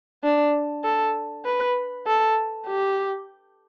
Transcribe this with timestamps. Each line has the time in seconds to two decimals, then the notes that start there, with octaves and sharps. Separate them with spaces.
0.23 D4
0.84 A4
1.45 B4
2.06 A4
2.67 G4